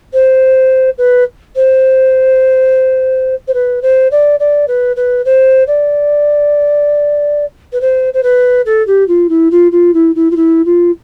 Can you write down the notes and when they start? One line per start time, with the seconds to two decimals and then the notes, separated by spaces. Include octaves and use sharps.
0.13 C5
0.98 B4
1.55 C5
3.47 C5
3.54 B4
3.82 C5
4.11 D5
4.39 D5
4.68 B4
4.96 B4
5.25 C5
5.67 D5
7.72 B4
7.81 C5
8.13 C5
8.23 B4
8.65 A4
8.87 G4
9.08 F4
9.29 E4
9.51 F4
9.71 F4
9.94 E4
10.15 E4
10.31 F4
10.36 E4
10.65 F4